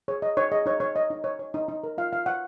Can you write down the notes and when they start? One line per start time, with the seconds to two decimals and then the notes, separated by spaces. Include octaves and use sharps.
0.08 G#4 C#5
0.22 C#5 D#5
0.37 D#4 C#5
0.52 G#4 D#5
0.66 D#4 C#5
0.80 D#4 C#5
0.95 C#5 D#5
1.10 D#4
1.24 C#5
1.39 C#5
1.54 D#4
1.68 D#4
1.84 A#4
1.98 F4 F5
2.13 F4 F5
2.26 C#5 F#5